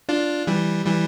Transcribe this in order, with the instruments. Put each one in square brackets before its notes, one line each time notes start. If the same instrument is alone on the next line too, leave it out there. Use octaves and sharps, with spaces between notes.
[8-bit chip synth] D4 F4
E3 G3
E3 G3